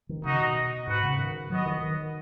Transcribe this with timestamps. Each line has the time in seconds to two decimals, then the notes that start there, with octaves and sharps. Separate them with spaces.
0.09 D#3
0.24 C#3 D#4 F#4 D#5
0.41 B2
0.87 G#2 F#4 B4 F#5
1.03 C#3
1.19 D#3
1.50 F#3 B3 F#4 D#5
1.66 D#3
1.81 D#3